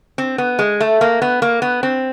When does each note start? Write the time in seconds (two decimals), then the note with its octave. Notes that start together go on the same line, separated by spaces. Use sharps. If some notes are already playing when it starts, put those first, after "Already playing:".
0.18 C4
0.38 B3
0.59 G#3
0.80 A3
1.01 A#3
1.22 B3
1.42 A#3
1.62 B3
1.83 C4